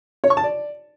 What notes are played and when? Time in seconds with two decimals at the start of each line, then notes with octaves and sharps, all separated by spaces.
0.24 C#5
0.30 C#6
0.37 A5
0.44 D5